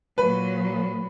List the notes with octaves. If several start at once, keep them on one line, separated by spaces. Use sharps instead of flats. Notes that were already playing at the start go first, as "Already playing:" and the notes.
A#2 F#3 B4